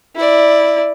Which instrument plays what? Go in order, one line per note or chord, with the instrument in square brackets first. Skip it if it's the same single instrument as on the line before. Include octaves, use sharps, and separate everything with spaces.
[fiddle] E4 D5